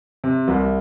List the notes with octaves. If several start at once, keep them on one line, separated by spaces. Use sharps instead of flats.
C3
C2